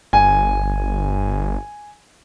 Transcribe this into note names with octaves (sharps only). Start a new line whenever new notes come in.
G1 G#5